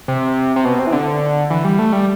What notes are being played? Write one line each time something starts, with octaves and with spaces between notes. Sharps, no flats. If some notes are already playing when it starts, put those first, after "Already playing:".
C3
C3
B2
C3
E3
D3
E3
G3
A3
G3